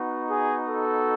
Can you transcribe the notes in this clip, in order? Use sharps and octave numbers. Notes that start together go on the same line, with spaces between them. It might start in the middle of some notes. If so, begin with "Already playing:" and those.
Already playing: B3 D#4 F#4
G#4
A4